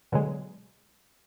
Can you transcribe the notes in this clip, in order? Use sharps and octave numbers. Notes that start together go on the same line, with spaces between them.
B2 D3 F#3 G#3